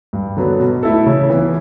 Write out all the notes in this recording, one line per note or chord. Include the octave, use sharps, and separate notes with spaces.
G2
D3 F#3 B3
B2
A3 E4 A4
C#3
E3 B3